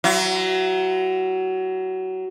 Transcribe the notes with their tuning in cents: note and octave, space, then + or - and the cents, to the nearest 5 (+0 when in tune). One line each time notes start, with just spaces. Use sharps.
F#3 +20 E4 +45